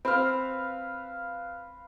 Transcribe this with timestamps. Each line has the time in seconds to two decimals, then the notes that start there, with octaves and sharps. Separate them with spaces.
0.05 C4 B4 F5